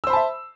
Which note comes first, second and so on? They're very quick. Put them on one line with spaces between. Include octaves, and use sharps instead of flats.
E6 C5 B5 A5 E5